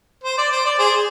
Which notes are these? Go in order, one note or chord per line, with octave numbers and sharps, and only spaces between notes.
C5
D5
C5
D5
G#4 C5